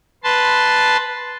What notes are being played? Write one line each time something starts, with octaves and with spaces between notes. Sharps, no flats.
B4 A5 C6